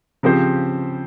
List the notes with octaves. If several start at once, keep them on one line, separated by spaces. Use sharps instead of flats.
C#3 F3 C4 G4 C5